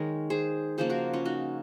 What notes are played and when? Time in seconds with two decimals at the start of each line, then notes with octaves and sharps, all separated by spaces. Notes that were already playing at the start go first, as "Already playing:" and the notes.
Already playing: D#3 G#3 G#4 A#4 C#5
0.30 G#4 C5
0.78 C#3 F3 A#3 G#4 C5
0.90 F#4 A#4
1.13 C#4 F4
1.25 D#4 F#4